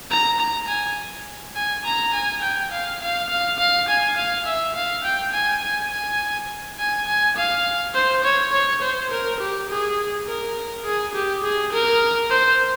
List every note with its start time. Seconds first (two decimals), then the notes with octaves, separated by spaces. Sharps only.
0.11 A#5
0.40 A#5
0.68 G#5
1.56 G#5
1.85 A#5
2.13 G#5
2.42 G5
2.72 F5
3.01 F5
3.29 F5
3.59 F5
3.88 G#5
4.17 F5
4.46 E5
4.75 F5
5.04 G5
5.33 G#5
5.62 G#5
5.91 G#5
6.79 G#5
7.07 G#5
7.36 F5
7.94 C5
8.24 C#5
8.53 C#5
8.82 C5
9.11 A#4
9.40 G4
9.69 G#4
10.27 A#4
10.85 G#4
11.15 G4
11.44 G#4
11.73 A#4
12.30 C5